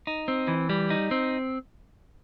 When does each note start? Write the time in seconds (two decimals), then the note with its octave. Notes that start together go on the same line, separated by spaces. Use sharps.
0.07 D#4
0.28 C4
0.48 E3
0.70 G3
0.90 D#4
1.11 C4